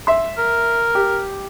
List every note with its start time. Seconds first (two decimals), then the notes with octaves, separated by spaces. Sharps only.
0.07 E5 C6
0.38 A#4
0.95 G4